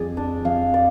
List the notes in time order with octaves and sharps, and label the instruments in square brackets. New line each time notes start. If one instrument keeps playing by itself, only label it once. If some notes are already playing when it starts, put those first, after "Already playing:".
Already playing: [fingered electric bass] F2 [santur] G#4 D5
[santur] D4
[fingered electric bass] F2 [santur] F5
[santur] D5